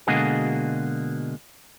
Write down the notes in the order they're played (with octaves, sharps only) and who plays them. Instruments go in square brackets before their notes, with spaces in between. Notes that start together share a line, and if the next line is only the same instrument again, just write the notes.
[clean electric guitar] B2 D3 G#3 A#3 F#4 G#4